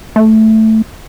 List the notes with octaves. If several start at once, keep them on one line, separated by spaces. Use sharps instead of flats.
A3